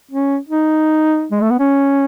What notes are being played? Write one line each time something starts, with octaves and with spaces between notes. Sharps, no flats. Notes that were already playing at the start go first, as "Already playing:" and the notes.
C#4
D#4
G#3
A3
B3
C#4